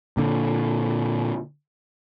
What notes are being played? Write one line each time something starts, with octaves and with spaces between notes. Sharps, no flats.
A#2 D3